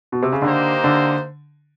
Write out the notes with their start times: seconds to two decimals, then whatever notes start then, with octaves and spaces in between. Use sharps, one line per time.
0.12 B2
0.23 C3
0.32 C#3
0.42 D3 A#3 D#4 G4 C5
0.84 D3